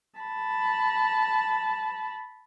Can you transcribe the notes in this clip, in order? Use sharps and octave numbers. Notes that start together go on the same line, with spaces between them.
A5 B5